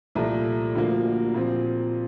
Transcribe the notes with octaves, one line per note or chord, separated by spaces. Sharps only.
C2 A#2 F3 A3
D2 D3 F3 A#3
A#2 F3 C4